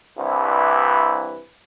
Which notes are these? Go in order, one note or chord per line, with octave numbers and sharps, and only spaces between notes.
C2 G2 C3 E3 E4 B4